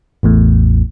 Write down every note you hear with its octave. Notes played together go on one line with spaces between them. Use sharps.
A1 E2 A2